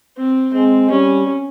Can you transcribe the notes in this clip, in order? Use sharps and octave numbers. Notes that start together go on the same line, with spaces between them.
C4
G#3 C4
G3 C#4